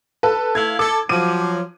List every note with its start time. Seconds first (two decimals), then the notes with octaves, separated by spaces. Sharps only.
0.23 A4 B4
0.55 A3 E4 F5 G#6
0.79 A4 D6
1.09 F3 F#3 D6 D#7